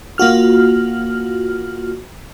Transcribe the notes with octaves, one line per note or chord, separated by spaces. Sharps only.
A#3 F4 F#4 F6